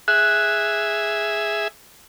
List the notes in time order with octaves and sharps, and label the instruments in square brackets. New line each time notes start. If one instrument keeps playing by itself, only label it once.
[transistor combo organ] G#4 E5 [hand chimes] F#6